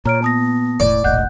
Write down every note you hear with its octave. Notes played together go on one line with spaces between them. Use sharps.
A#2 C#5 A#5 F6 D7
B3 A5 D#6 A#6
E1 A2 D5
E1 A#1 A2 D#5 F#5 F#6 G6